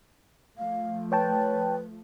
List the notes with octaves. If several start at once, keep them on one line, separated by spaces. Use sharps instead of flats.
F3 A3 F5
B4 C#5 G5 A5